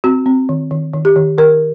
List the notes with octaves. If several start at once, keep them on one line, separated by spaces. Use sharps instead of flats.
C4 F#4
C4
D#3
D#3
D#3
G4
D#3
D#3 A#4